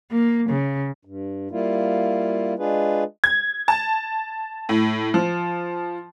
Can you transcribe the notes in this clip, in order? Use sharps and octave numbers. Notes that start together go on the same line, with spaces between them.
A#3
C#3
G2
G3 A#3 E4 F4
G#3 D4 F4 G#4 B4
G#6
A5
A2
F3